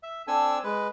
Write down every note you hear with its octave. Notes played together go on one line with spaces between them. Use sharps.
E5
C4 D4 A4 G#5 E6
G#3 B4